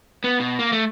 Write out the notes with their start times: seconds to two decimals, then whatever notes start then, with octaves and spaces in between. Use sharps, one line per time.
0.24 B3
0.40 B2
0.59 A#3
0.72 A3